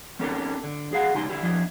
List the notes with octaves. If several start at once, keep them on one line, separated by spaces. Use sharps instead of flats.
C4 C#4 D#4 G4 A4 A#4
D3
G#4 D#5 F5 F#5
C#2 D#4 G4 G#5 C6
D3 E4 G4
F2 D4 E4 D#5